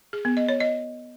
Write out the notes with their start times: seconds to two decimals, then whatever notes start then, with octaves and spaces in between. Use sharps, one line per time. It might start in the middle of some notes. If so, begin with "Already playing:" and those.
0.13 G#4
0.25 B3
0.37 D#5
0.49 C#5
0.60 D#5